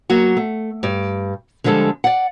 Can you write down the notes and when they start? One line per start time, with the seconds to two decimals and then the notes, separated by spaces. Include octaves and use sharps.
0.10 F#3 A#3 F#4
0.37 A3
0.83 G2 D5
1.64 D3 F3 G3 G#3 A4
2.04 D5 F#5